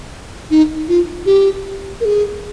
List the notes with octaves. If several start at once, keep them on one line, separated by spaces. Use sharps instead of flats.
D#4
F4
G4
A#4
G#4